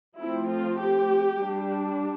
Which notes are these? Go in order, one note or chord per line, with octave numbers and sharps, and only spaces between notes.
F3 A3 C4 E4
F4
G4
G3 D4